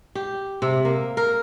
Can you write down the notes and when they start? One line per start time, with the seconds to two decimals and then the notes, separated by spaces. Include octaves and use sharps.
0.15 G4
0.62 C3
0.85 A#3
1.17 A#4